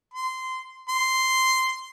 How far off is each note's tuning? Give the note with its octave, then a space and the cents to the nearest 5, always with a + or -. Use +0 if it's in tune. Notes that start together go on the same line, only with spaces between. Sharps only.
C6 -15
C6 -5